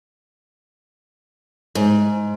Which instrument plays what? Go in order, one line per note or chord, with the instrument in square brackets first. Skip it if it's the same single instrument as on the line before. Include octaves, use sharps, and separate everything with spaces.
[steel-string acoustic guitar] G#2